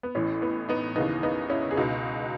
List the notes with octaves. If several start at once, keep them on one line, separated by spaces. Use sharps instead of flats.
B3
A1 A2 E3 C#4
B3
B3 D#4
D#2 C#3 E3 B3 D#4
B3 D#4
C#4 E4
G#4
C#2 B2 D#4 F#4